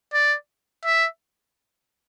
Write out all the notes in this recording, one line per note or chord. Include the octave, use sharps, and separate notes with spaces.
D5
E5